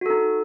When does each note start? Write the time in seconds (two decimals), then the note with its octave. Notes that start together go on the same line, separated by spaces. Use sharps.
0.01 F#4
0.06 A4
0.10 D#4